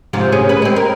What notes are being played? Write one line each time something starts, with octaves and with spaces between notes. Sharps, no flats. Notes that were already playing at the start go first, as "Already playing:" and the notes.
G#2 C3 F3
D2 C#4 G#4
B4
G#3 C4
A#4